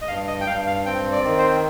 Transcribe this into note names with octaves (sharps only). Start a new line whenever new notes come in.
D#5
G2 F5
D#5
G5
G2 F5
F5
C4 G5
D5
D#3
C5